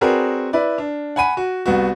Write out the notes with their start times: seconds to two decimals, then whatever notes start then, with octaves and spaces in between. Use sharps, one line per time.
0.01 C4 F#4 G#4 A#4 B4 D5
0.53 E4 B4 D5
0.78 D4
1.16 F#5 G#5 B5 D#7
1.37 F#4
1.66 C2 B3 F#4